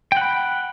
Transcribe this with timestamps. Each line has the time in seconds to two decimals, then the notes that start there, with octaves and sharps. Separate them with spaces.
0.12 G5
0.17 F#5
0.21 B5